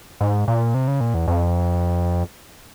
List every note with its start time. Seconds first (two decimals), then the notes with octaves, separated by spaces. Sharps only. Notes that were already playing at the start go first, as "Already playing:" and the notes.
0.21 G#2
0.48 A#2
0.74 C3
0.88 C#3
1.00 A#2
1.14 E2
1.28 F2